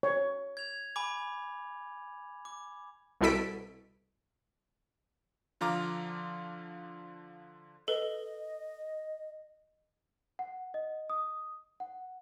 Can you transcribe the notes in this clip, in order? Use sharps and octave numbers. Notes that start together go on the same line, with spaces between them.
C#5
G#6 F7
G#5 B5 D6
D6
C2 B2 E4 A4 B6 D7
D3 F3 F4 A#5 D6 F6
A4 B4 D#5
F#5
D#5
D#6
F#5